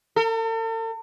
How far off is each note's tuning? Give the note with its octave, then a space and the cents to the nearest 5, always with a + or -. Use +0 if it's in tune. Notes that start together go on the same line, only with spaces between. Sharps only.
A4 +45